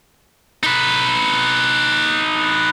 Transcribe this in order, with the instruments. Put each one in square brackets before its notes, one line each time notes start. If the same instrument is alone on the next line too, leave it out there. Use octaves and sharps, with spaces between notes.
[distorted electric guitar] D#4 B4